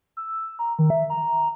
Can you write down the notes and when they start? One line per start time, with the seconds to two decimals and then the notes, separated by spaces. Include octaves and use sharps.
0.17 E6
0.59 A#5
0.79 D#3
0.90 E5
1.10 A#5